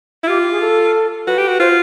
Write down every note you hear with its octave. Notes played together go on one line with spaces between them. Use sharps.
E4
F4 G4
G4
G#4
A4
F#4 B4
G4
F#4
F4 C5